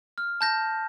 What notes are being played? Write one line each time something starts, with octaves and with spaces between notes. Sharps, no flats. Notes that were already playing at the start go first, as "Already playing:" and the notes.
F6
A5 G6 A#6